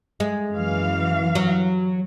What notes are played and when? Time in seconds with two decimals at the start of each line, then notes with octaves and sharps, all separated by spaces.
0.20 G#3
0.54 F#2 E3 F5
1.35 F#3